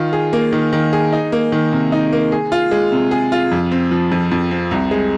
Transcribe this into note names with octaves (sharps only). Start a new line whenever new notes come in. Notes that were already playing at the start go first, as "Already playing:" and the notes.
Already playing: D#3 F4
G#4
A#3
D#3
D#3
G#4
D#4
A#3
D#3
C3
D#4
A#3
G#4
F4
G#3
C3
G#4
F4
F2
C4
F3
F2
F2
C4
C2
G#3